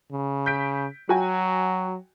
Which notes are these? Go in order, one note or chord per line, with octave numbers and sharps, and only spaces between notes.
C#3
G6 B6 D7
F#3 F#4 G5 G#5